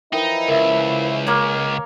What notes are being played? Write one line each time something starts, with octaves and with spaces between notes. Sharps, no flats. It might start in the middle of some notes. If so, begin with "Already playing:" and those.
E3 F3 D#4 E4 A#4 G5
C#2 A#4 E5
A#3 C#5 F6 F#7